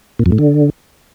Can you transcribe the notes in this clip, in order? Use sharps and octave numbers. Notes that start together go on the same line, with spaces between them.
A#2
F2
A2
D3